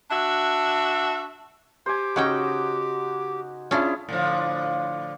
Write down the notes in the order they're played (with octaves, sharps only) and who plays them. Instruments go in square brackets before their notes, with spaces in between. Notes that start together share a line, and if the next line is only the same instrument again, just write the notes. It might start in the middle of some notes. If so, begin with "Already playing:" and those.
[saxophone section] D4 F#4 E5
[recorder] G4 [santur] C5 G#5
[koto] C#3 C#4 G5 [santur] D#4 F#4 F#5
[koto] C#4 D4 [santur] E4 G#4 [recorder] F4
[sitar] A2 D3 F3